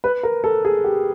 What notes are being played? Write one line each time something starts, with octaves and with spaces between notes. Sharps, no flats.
B4
A#4
A4
G#4
G4